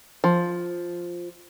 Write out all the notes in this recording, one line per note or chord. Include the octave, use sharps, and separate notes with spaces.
F3